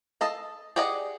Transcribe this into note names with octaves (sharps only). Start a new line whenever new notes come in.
A4 D#5 F5
G4 G#4 D5 D#5 F#5